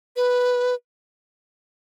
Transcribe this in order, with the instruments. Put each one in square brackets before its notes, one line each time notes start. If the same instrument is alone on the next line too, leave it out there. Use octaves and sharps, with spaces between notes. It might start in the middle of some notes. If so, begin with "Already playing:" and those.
[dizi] B4